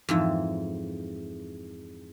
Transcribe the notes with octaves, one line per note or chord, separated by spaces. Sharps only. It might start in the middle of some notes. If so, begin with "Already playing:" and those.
F2 G#2 E3